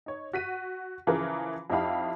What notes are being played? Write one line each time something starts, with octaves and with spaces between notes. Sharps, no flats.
D#4 C#5
F#4 B6 D#7
C#3 E3 F3 G#4 A#4
F2 D#4 E4 G4 F5 B5